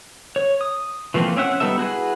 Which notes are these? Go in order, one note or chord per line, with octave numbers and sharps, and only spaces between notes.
C#5
D#6
E3 F3 A3 A#3 C4
C4 C#4 E5 F#5
G3 B3 D#4 A4 E5
E4 F#4 G#4 B4